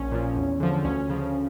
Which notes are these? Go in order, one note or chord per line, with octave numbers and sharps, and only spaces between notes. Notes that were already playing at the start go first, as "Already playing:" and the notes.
Already playing: A#1 C#4
A#2 F3
E2
D3 F3
D2 C#4
C#3 F3